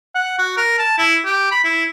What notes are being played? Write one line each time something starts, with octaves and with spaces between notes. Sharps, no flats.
F#5
F#4
A#4
A5
E4
G4
B5
E4